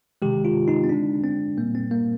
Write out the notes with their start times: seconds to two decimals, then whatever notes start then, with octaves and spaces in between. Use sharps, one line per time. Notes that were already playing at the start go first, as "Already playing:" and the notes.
0.22 C3 D#3 G#3 G4
0.45 F4
0.68 D#4
0.84 C4
0.89 D3 G#3 D4
1.24 C4
1.57 A#2 G3 A#3
1.75 C4
1.91 A#3